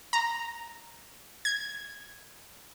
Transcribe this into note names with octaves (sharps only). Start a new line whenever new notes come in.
A#5
G#6